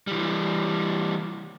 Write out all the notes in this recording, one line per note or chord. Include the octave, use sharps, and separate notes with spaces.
E3 G3